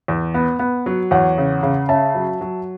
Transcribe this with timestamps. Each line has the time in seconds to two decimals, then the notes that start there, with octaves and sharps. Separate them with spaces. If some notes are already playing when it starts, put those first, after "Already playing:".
0.08 E2
0.34 B3
0.59 B3
0.86 F#3
1.11 E2 C#5 F#5
1.38 C#3
1.63 C#3
1.89 C#4 E5 A5
2.15 F#3
2.41 F#3